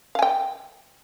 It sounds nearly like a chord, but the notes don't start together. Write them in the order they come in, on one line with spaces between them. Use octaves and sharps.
F5 G#5 G5